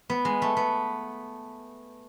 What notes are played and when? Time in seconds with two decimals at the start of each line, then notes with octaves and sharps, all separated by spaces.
0.10 B3
0.25 G#3
0.42 A3
0.57 B3